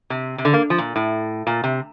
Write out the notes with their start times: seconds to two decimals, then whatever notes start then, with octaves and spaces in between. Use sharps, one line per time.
0.10 C3
0.38 C3
0.45 D3
0.53 A#3
0.70 F3
0.78 A#2
0.96 A2
1.47 A#2
1.64 C3